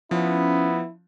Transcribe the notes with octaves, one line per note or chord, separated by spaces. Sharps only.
F3 B3 C#4 E4